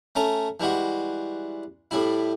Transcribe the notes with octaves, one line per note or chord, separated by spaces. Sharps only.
A3 C#4 A#5
E3 G3 G#3 F#4
A2 G3 E4